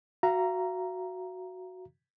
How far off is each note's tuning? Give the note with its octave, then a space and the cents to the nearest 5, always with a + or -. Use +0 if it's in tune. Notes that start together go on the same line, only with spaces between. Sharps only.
F#4 +0 F5 -45 A#5 +0